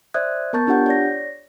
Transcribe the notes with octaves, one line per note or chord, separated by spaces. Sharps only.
C5 D5 E5 D#6 F#6 G#6
B3 A#4 A5 C#6 G6 A6
D4 F4 G4 C#5 F#5 G6
C#5 D5 A#6